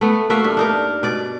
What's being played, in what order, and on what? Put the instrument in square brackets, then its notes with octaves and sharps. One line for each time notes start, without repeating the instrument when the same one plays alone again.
[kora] A3 B3
A3 A#3 F#4 E5
G2
D4 D#4 A#4
B2 D5